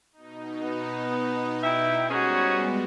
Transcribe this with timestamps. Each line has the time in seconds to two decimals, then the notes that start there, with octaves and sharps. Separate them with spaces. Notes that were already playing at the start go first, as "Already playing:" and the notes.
0.12 B2 D#4
0.61 B3
1.63 E4 E5 G5
2.10 G#2 G3 G#3 B3 C#4 F#4 G#4